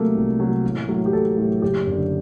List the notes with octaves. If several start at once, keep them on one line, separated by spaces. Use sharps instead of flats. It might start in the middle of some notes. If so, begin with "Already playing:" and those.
Already playing: C3 F#3 A3 A#3
C2
C3 F#3
A1
A2 F#3
G4
A1 A4
A2 F#3
F#1 G4
F#2 D3